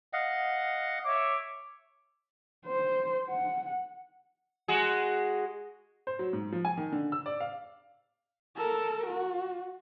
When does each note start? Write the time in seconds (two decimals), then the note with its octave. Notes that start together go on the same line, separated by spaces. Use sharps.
0.13 D#5 F5 F#5
1.05 C#5 E5 D6
2.66 C5
3.29 F#5
4.68 G#3 F#4 G#4
6.07 C5
6.19 F#3
6.33 G#2
6.52 F3
6.65 G#5
6.77 D#3
6.92 D3
7.12 E6
7.26 D5
7.40 F5
8.56 A4 A#4
9.06 F#4